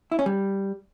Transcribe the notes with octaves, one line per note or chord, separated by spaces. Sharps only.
E4
C#4
G3